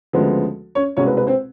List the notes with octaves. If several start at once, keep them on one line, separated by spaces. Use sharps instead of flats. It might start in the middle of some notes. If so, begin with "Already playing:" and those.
D2 C#3 F3 G#3 B3
C#4 C#5
C2 B2 G#3 C4 C#4 C#5
B4
B4
C4 C5